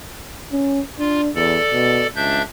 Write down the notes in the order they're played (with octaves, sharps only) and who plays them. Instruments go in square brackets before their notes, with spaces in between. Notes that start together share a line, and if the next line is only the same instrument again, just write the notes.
[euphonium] C#4
[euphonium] D4 [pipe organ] F4
[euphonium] E2 [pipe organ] A4 D5
[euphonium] B2
[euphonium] C#2 [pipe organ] D4 E5 G6